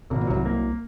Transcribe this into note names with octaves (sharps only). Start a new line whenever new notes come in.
G#1 C3
A#2
C2 C3 F#3
A#3